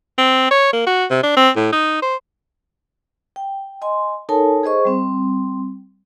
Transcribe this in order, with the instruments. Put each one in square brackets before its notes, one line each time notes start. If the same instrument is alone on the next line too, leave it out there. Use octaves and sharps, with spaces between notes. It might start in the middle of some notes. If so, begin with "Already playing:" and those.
[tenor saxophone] C4
C#5
A#3
F#4
C3
D4
C4
A2
D#4
C5
[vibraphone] G5
D#5 G#5 C6
D#4 A4 A#4 C#5 G#5 A5
G#4 C5 D#5 C#6
G3 C4